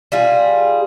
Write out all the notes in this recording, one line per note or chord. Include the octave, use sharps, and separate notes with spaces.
G3 F4 G#4